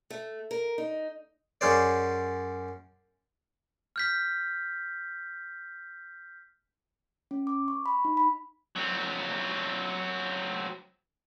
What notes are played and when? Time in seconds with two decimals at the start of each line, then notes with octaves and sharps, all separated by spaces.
0.10 A3
0.51 A#4
0.78 D#4
1.61 F#2 C#4 G#4 C5 D5
3.96 F6 G6 B6
7.31 C#4
7.47 D6
7.68 C#6
7.86 B5
8.05 D#4
8.17 B5
8.76 F#3 C4